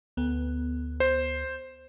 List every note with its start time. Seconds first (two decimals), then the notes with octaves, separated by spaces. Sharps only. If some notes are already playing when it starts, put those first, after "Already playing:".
0.17 D2 B3
1.00 C5